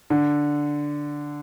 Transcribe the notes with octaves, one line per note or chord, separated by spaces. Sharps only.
D3